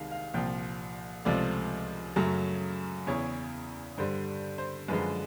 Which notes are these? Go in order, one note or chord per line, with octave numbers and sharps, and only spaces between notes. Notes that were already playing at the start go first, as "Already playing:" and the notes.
Already playing: C2 C3 D#3 G#3 F5
F5
C2 A#2 F3 G5
C#2 C3 F3 A3 D5
F#2 C#3 F#3 A3
E2 C#3 E3 C#5
G2 D3 G3 C5
C5
F#2 D3 F3 G#3 B4